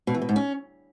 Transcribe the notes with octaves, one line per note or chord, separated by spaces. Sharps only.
B2
E3
B2
G#2
C#4